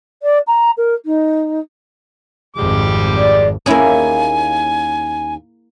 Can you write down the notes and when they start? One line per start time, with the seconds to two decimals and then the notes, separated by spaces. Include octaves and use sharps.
0.23 D5
0.47 A#5
0.77 A#4
1.05 D#4
2.57 G#1 F2 G3 G#3 D6
3.17 D5
3.66 D#2 A#3 C#4 E4 G#4 G#5